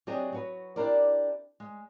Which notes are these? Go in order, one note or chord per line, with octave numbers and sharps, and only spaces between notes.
F#3 C4 D4 G4 G#4 D#5
F#3 F#4 B4
D4 E4 G4 A#4 C5 D5
G#3